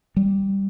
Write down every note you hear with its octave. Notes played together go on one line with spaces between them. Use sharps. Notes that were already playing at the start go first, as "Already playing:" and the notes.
G3